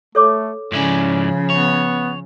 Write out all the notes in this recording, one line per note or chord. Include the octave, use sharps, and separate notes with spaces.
A3 A4 C#5 D6
G#2 C#3 F3 C#4 E4 D5
B3 C#5